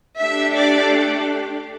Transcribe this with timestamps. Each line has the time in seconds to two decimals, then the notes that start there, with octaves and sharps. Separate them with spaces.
0.19 A3 D4 G4 E5
0.57 D5